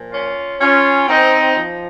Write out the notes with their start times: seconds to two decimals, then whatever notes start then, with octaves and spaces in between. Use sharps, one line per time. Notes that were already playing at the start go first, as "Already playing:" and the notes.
Already playing: A#2 F3
0.12 C#4 F4
0.60 C#4 F4
1.08 C4 D#4
1.57 F3